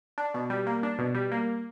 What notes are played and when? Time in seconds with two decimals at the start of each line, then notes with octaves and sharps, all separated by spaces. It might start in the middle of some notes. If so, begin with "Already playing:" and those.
0.18 D4
0.34 B2
0.50 G3
0.67 A#3
0.83 D4
0.99 B2
1.15 G3
1.32 A#3